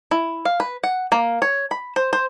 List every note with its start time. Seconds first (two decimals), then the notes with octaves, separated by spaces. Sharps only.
0.11 E4
0.45 F5
0.60 B4
0.84 F#5
1.12 A#3
1.42 C#5
1.71 B5
1.96 C5
2.13 C5